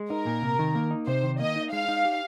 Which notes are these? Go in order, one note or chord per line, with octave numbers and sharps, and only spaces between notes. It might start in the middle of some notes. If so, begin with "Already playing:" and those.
Already playing: G#3
D#4 A#4
A#2
C3
D#3
A#3
D#4
C3 C5
D#3
A#3 D#5
D#4
G#3 F5
D#4
G4